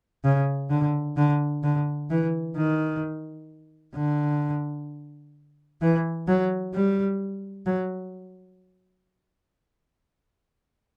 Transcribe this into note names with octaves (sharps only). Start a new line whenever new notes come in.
C#3
D3
D3
D3
E3
D#3
D3
E3
F#3
G3
F#3